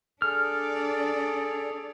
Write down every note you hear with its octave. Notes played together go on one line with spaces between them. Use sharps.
D4 G#4 A4 D5 F6